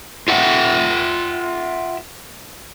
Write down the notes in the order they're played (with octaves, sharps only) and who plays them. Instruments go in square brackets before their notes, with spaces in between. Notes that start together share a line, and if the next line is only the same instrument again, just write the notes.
[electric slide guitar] F4 E5 F#5 G5